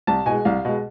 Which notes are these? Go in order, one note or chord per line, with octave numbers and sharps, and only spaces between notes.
C2 A5
B2 G#3 G#5
C2 F5
B2 G#3